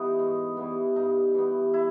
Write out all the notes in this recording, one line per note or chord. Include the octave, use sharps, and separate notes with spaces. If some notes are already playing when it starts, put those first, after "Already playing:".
Already playing: E3 G3 B3 D#4
G#2
E3 G3 B3
G2 D#4
E3 G3 B3
E4